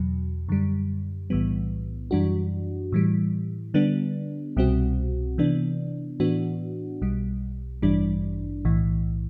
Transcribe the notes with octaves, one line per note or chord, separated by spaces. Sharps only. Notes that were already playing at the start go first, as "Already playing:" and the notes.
Already playing: E2 B2 F#3
F#2 D3 G3
B1 A2 E3 G3 B3
F#2 E3 G3 D4 F#4
A2 E3 G3
D3 G3 B3 D4
C2 B2 G3 C4 F#4
C3 E3 B3 D4
A2 E3 B3 D4 F#4
B1 B2 G3
A1 G2 E3 G3 D4
B1 A2 E3